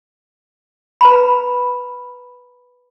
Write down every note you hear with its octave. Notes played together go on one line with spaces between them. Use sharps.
B4 A#5 B5